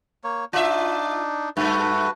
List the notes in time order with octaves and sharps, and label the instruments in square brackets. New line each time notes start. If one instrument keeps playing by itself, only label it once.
[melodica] A#3 C#5
[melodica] D4 D#4 [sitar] F4 E5
[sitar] G2 A3 [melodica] F#4 B4